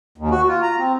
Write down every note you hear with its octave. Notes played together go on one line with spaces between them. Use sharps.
D#2
F#4
F4
A#5
C4